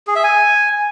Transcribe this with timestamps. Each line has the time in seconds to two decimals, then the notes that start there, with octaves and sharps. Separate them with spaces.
0.07 G#4
0.16 E5
0.24 G#5